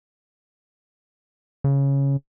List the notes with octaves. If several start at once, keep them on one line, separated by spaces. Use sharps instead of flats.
C#3